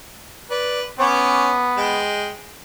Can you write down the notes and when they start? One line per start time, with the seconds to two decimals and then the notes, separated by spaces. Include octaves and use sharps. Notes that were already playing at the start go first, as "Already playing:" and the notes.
0.50 B4 D5
0.99 B3 C#4 C#5 D6
1.77 G#3 G5